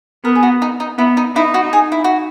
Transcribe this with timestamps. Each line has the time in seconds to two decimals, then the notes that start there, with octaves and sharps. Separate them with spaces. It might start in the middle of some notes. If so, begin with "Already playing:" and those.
0.25 B3 A#4
0.35 G#4
0.43 F#4
0.62 D#4
0.80 D#4
0.98 B3 E4
1.17 D#4
1.36 D#4 E4
1.54 F#4
1.73 G#4
1.92 E4
2.04 F#4